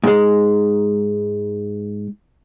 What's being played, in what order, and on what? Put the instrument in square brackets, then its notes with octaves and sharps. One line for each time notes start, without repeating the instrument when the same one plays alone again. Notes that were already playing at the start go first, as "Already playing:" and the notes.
[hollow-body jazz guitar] G#2 G#3